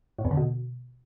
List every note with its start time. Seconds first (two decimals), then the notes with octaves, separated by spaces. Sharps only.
0.19 A2
0.25 E2
0.31 D3
0.37 B2